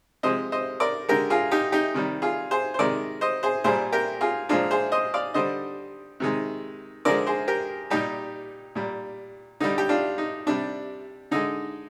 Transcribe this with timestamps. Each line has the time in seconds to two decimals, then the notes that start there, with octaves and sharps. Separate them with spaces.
0.23 C3 F3 G#3 C5 D#5
0.52 C5 D#5
0.80 A#4 D5
1.08 D3 G#3 G4 A#4
1.30 F4 G#4
1.51 D#4 G4
1.72 D#4 G4
1.94 C3 D#3 G3
2.22 F4 G#4
2.51 G#4 C5
2.74 C5
2.79 C3 D#3 G#3 A#4 D5
3.21 C5 D#5
3.43 G#4 C5
3.64 A#2 G3 G#4 C5
3.92 G4 A#4
4.21 F4 G#4
4.49 A#2 F3 G#3 D4 F4
4.71 G#4 C5
4.92 C5 D#5
5.14 D5 F5
5.34 D3 G3 C5 D#5
6.20 C3 D#3 G#3
7.05 D3 F3 G#3 A#4 D5
7.26 G#4 C5
7.48 G4 A#4
7.90 A#2 G3 D#4 G4
8.75 A#2 G3
9.60 D3 G3 D#4
9.78 G4
9.89 D4 F4
10.18 D#4
10.47 C3 G3 D4
11.31 D3 G#3 D#4